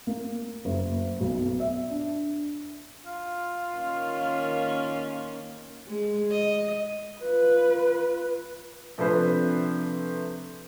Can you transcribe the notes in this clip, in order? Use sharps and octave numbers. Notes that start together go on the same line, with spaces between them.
A#3
F#1
B1
B3
E5
D4
F4
D#3 A#3 C#4
G#3
D#5
F4 B4
C3 F3 A3 D4 B4 C5